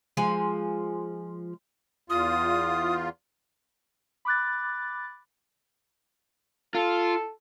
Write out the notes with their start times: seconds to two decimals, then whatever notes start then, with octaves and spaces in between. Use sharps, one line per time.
0.17 F3 G#3 G#5
2.10 E2 F4 D#6
4.25 B5 D6 F#6 A6
6.75 F4 A4